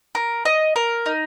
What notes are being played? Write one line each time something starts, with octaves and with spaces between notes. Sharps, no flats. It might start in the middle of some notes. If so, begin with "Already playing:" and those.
A#4
D#5
A#4
D#4